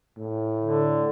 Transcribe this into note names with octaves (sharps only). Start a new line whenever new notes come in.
A2
D3